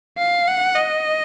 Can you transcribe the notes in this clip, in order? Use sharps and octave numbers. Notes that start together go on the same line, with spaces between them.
F5
F#5
D#5